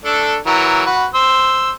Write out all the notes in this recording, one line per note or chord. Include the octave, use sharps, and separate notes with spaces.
A3 D4 A4
E3 F#3 A#4
F#4 B4
C5 E6